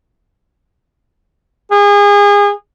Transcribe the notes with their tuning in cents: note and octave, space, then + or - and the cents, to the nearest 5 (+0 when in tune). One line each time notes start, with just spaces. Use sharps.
G#4 -30